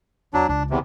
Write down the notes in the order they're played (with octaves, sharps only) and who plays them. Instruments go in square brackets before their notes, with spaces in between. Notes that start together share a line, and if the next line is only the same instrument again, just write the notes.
[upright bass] E2 [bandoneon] F#3 D4
[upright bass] C#2 [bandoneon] D4
[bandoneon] E2 C3